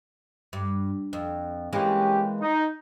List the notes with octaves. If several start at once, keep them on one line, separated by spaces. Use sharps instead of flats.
G2
F2
E3 G#3 A#3 C#4 G4
D#4